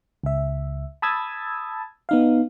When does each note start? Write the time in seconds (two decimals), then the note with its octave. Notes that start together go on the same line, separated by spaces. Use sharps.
0.23 C#2 E5
1.02 A5 B5 D#6 E6 G#6 A6
2.09 B3 D#4 F5